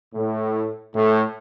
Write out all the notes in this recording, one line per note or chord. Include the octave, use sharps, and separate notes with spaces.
A2
A2